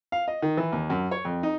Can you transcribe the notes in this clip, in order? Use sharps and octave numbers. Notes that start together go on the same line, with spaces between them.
F5
D#5
D#3
E3
D#2
F#2
C#5
F2
D#4